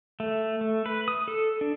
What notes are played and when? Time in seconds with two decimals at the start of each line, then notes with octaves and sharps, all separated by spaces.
0.20 A3
0.61 A3
0.86 B4
1.08 D#6
1.28 A4
1.61 D4